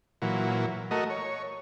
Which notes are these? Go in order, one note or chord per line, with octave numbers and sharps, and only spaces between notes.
A#2 E3 F#3
A3 F#4 A#4 D#5
C#5